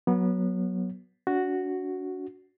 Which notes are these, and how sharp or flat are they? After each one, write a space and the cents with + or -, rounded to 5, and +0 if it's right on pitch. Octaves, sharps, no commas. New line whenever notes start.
F#3 +0 B3 -20 C#5 +0
D4 -40 F#4 +0